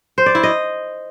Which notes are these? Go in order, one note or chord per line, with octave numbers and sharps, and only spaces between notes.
C5
D5
E4
D#5